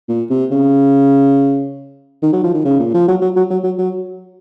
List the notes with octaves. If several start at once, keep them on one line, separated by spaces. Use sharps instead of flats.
A#2
C3
C#3
D#3
F#3
F3
D#3
C#3
A#2
F3
F#3
F#3
F#3
F#3
F#3
F#3